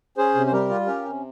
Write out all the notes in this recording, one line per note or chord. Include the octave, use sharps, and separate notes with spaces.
C#4 G#4 C5
C3
C5
G3 G4 A#4
F4
C#4 G4 A#4
C3